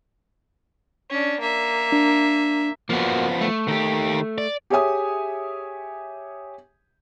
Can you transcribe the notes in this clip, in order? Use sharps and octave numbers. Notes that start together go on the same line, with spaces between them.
C#4 D4
A#3 E5
D4
F3 A#3 B3 F#4
A3
D#3 G4
D5
G4 G#4 C#5 E5 G#5 D#6